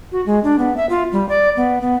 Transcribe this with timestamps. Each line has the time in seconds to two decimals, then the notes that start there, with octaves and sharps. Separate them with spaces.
0.12 F#4
0.26 G#3
0.44 D4
0.59 B3
0.77 E5
0.89 F4
1.12 G3
1.29 D5
1.57 B3
1.81 B3